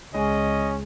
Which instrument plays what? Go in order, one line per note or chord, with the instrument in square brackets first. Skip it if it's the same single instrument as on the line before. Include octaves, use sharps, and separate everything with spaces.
[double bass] C#2 [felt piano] G#3 [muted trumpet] C#4 [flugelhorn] D#5